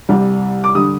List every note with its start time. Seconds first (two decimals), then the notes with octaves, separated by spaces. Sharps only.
0.09 C2 C3 G3
0.64 D6
0.75 D3 G3 D#6